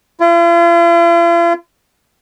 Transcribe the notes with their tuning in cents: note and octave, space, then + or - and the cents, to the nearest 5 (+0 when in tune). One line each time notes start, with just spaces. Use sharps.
F4 -45